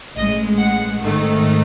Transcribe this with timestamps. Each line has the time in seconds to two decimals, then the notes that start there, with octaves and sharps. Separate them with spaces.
0.16 A1 A2 G#3 D#5
0.58 F#5
1.01 G#2 D#3 A3